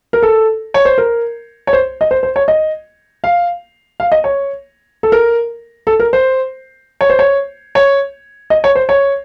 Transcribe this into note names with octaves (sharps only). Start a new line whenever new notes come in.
A#4
A4
C#5
C5
A#4
C#5
C5
D#5
C5
C5
C#5
D#5
F5
F5
D#5
C#5
A4
A#4
A4
A#4
C5
C#5
C5
C#5
C#5
D#5
C#5
C5
C#5